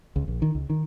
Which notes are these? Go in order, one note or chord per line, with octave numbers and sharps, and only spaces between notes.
C#2
A#1
D#3
C#2
D#3